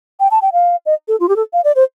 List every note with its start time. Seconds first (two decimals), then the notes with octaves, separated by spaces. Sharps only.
0.20 G5
0.31 A5
0.42 G5
0.53 F5
0.86 D#5
1.08 A4
1.20 F4
1.29 G4
1.36 A4
1.53 F5
1.64 D5
1.76 C5